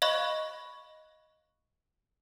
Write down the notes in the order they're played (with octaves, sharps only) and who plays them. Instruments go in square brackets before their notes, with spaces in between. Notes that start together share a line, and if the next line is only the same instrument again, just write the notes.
[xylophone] D#5 F5 B5 C#6 F#6